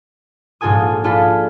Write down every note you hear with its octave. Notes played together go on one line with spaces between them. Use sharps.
A#1 G#2 F4 A4 G#5 D#6
D4 F4 G#4 A4 B5